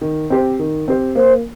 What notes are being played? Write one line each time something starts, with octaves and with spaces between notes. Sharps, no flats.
D#3
C4 G4 C5
D#3
C4 G4 C5
A#3 C5